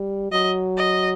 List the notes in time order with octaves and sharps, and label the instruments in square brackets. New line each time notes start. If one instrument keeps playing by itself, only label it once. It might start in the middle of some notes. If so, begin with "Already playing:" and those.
Already playing: [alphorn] G3
[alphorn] F#3 [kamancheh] D#5
[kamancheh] D#5